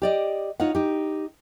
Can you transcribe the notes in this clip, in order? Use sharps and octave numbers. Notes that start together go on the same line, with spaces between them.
G4 D5 D#5
D#4 F4 C#5 F#5
D#4 G4